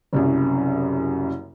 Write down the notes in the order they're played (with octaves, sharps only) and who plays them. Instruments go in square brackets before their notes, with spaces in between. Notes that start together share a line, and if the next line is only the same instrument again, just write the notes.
[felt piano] F#1 C2 F#2